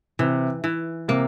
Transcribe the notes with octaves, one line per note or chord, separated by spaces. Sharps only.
C3 E3
E3
C3 A#3